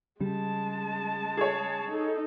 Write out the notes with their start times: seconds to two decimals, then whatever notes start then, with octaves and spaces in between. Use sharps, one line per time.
0.20 C#3 G3 G#3 A5
1.37 G#4 C#5
1.89 D#4 A4